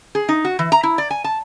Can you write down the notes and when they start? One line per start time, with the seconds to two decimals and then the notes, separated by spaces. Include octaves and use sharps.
0.15 G#4
0.29 D#4
0.45 F#4
0.59 E3
0.72 A#5
0.83 E4
0.98 D5
1.11 G#5
1.24 A5